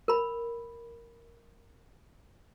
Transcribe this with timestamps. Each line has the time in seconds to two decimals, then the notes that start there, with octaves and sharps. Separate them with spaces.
0.08 A#4 B5